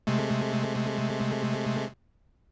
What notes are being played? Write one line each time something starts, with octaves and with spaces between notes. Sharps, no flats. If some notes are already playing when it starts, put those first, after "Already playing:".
C3 G#3 A3